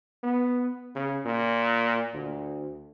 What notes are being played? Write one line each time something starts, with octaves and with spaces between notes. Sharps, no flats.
B3
C#3
A#2
D2